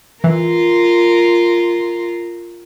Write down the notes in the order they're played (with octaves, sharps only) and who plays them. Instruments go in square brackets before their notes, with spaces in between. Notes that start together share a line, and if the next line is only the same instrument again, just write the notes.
[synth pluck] E3 [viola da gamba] F4 A#4